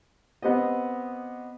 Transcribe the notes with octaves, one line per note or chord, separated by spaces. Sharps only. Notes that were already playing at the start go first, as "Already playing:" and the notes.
B3 C4 G4 D#5